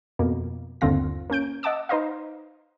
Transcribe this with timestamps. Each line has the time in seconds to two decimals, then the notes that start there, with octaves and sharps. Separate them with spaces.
0.19 F2 B2 A#3
0.81 G1 D#2 D3 C4 F4 A#6
1.30 A#3 C#4 G6 D7
1.63 D#5 F#5 A5 D6 E6
1.89 D#4 B4 C5 D#5 F5